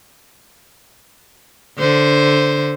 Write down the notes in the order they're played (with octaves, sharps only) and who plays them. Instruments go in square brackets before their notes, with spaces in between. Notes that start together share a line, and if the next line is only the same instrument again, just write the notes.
[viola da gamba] D3 C5